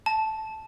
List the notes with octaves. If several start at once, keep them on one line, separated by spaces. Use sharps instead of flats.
A5